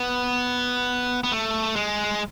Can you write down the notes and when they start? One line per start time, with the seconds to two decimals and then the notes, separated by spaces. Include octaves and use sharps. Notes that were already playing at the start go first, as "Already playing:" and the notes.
Already playing: B3
1.24 B3
1.32 A3
1.76 G#3